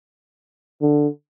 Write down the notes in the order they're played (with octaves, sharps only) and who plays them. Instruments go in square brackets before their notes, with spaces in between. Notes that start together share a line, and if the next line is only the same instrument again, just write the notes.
[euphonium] D3